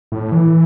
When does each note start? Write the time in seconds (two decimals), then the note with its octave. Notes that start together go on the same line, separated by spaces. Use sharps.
0.12 A2
0.32 E3